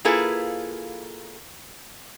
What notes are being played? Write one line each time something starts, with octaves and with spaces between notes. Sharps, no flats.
A#3 E4 F4 G#4 A4 B4